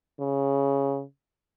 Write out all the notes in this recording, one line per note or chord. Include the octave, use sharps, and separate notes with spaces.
C#3